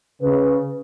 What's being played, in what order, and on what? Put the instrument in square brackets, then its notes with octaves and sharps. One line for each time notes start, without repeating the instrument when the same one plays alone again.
[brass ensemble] C#3 [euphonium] B4